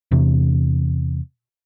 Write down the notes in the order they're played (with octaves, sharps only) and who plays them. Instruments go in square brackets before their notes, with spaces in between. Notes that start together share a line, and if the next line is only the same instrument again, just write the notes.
[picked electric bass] E2 C3